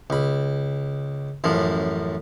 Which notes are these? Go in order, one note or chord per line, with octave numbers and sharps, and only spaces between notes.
C#2 B5
A1 F#2 F3